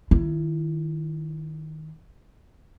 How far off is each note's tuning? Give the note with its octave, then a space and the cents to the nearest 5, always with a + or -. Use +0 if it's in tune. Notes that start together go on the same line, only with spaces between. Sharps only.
D#3 +0 E4 +30